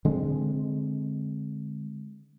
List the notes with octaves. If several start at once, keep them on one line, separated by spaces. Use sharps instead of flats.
D3 G#3 C4